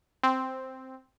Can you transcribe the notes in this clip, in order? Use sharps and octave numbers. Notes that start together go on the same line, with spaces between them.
C4